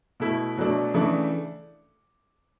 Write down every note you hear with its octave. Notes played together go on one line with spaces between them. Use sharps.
B2 A3 E4
B2 F#3 A3 D4
C#3 E3 A3 D4